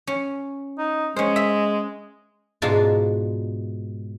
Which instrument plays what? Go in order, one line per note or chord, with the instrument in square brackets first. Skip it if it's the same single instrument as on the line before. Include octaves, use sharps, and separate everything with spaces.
[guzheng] C#4
[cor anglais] D#4
[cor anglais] G#3 [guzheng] C#4 C5
[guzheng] E5
G#2 B2 G#3 D4 F4